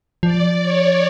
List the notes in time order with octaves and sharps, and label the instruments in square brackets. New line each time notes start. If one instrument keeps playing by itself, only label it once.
[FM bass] F3 [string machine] D5
[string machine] C#5